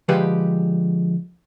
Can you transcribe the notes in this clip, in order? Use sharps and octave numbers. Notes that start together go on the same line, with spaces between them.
D3 F3 G#3 G4 B4